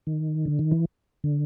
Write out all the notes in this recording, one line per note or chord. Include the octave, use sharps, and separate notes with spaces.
D#3
D3
D#3
E3
D3